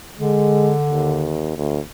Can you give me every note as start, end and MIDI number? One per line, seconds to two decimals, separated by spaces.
0.19 1.44 50
0.19 0.73 56
0.87 1.56 39
1.57 1.79 38